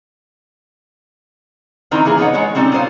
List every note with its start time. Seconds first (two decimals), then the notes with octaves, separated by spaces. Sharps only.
1.91 D#3 C4 D#4 E4 A#4 C5
2.05 E3 A#3 B3 G#4
2.18 D#3 B3 D#4 C#5 F#5
2.34 G#3 B3 C#5
2.55 G3 C4 C#4 D#4 A4
2.72 B3 D#4 F4 C5 C#5 F5